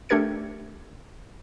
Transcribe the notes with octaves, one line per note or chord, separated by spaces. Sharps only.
A3 D4 G4 A#4 G#6 C#7